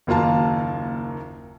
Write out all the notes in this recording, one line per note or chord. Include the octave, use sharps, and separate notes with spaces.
F#1 D#2 A#3 F4 F5 A5